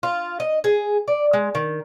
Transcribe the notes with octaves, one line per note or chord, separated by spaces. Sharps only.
F4
D#5
G#4
D5
G#3
D#3